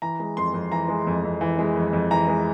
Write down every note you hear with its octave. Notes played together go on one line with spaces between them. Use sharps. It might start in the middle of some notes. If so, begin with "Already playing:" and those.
E3 A#5
G#3
F2 C6
F2
E3 A#5
G#3
F2
F2
E3
G#3
F2
F2
E3 A#5
G#3